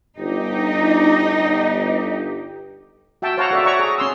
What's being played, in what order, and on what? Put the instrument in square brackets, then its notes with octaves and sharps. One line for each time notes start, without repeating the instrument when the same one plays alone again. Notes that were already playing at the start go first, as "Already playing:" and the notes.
[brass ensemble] G1 G4 [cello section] D#4
[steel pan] F#4 E5 G5 A5
C5 C#5 F5 F#5 A5 A#5
F#4 A4 D5 E5
C#5 D5 E5 F#5 A#5 C#6
G#4 A#5
C#4 C6 E6